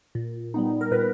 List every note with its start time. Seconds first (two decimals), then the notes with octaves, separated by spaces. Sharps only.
0.15 A#2
0.54 G3 B3 D#4
0.81 A#4
0.91 A#2 B4